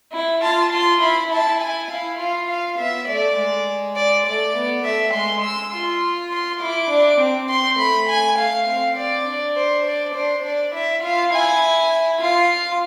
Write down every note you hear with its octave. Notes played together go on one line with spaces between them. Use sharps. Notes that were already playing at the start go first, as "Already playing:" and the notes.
E4
F4 A5
F4 C6
E4 B5
E4 A5
G#5
E4 F5
F4 F5
F5
B3 E5
A3 D5
G#3
D5
A3 D5
B3
A3 E5
G#3 C6
E6
F4 C6
C6
E4 D6
D4
C4
C4 C6
A3 B5
G#5
A3 F5
C4 F5
D5
D4
C5
D5
D4 C5
D4 D5
E4 E5
F4 F5
E4 G#5
F4 F5